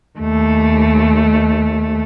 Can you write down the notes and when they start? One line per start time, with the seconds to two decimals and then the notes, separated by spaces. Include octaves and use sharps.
0.19 D#2 A3